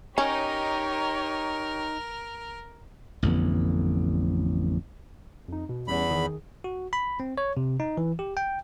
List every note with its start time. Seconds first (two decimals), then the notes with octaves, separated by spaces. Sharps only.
0.18 C#4 D#4 G4 A#4 C#5 D#5
3.23 A1 F2 D3 B3
5.48 F2 D#4
5.69 B2
5.88 E2 G3 C#4 B5
6.11 D#3 G#4
6.64 F#4
6.93 B5
7.20 C4
7.38 C#5
7.57 C3
7.80 D#4
7.97 E3
8.19 G4
8.37 G5